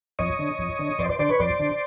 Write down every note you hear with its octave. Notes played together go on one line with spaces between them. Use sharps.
F2 C#5 D#5
D3
F2
D3
F2 C5 D5
C5 D5
D3 C5 D5
B4 C#5
F2 C5 D5
D3